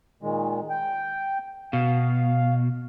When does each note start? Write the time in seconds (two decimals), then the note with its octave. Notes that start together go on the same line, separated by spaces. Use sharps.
0.23 A#2 D#3 G#3
0.70 G5
1.73 B2 F5